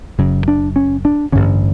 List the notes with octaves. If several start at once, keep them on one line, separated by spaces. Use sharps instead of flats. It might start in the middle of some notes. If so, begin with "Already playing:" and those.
F#1 F#2 C#3
D4
C#4
D4
A1 G2 D3 C#4